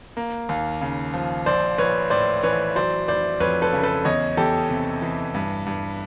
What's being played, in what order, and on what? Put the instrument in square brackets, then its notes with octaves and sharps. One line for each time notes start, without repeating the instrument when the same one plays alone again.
[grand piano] A#3
D#2
C#3
F3
A#1 C5 D5
A#1 B4 C#5
A2 C5 D5
E3 B4 C#5
F#3 C5 D5
F1 C5 D5
F2 B4 C#5
A4 B4
C#3
A4 B4
E2 C#5 D#5
E2 G4 A4
C3
E3
G2
G2